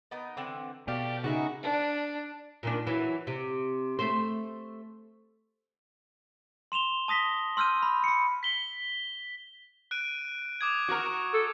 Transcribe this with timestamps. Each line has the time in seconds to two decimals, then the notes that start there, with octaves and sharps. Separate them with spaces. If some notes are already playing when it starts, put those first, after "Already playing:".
0.11 B3 D#4 A#4
0.37 D3 E3 C4
0.88 B2 A3 G4 D5 F5
1.24 C#3 B3 D#4 F#4 G#4 A#4 E5
1.63 D4
2.63 A#2 D#3 D4
2.87 E3 F#3
3.27 C3
3.99 A3 C5
6.72 C6 E7 F7 G7
7.08 A5 D#6 A#6 B6 G7
7.57 C6 E6 F6 G6 D#7
7.83 B5
8.04 B5 C#7
8.43 B6 G7
9.91 F#6 D7 D#7
10.61 D6 D#6 G#6
10.89 F#4 A#4
11.34 A4